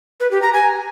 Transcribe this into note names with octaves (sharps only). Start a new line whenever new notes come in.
B4
G4
A#5
G#5